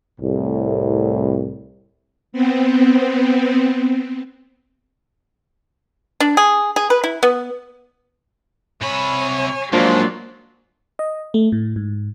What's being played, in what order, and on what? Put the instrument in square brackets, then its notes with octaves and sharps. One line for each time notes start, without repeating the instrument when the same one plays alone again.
[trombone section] C2 A2
[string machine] B3 C4
[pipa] D4
G#4
G#4
B4
E4
B3
[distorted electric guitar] C3 B5 [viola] C#5 G#5
[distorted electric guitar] G#2 [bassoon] F3 [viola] F#3 D5 [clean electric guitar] A#3 D4 F4
[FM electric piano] D#5
A3
A2
G#2